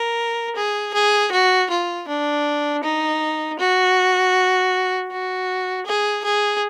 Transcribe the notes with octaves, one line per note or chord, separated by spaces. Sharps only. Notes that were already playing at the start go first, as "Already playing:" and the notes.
Already playing: A#4
G#4
G#4
F#4
F4
D4
D#4
F#4
F#4
G#4
G#4